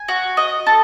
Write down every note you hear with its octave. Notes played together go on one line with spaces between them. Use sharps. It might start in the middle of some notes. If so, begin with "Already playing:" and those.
Already playing: G#5
F#4
D#5
A4